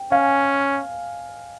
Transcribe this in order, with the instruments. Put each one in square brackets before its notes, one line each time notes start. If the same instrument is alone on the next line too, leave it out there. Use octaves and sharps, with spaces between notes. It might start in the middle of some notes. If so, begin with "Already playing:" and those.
Already playing: [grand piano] G5
[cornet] C#4 [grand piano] F5 G#5